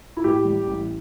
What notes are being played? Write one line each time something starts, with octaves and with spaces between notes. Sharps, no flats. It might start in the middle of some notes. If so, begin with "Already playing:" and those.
E4
A2 G4
G3
A1